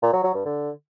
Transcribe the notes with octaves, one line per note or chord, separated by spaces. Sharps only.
A#2
F#3
F#3
G2
D3